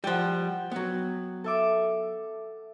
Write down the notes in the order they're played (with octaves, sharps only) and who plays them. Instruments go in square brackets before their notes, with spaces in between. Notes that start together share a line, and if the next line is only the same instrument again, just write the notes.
[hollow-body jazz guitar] F3 G3 [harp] F#5 G5
[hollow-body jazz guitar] F#3 B3
[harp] A4 E5 D6